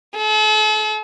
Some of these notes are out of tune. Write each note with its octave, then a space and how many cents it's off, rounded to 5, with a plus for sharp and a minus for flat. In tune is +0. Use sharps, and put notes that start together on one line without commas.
A4 -40